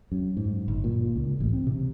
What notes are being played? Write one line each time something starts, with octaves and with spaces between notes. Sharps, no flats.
F#2
G#2
G1
A#2
C#2
A1
C4
C3